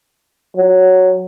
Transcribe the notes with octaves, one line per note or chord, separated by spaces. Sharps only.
F#3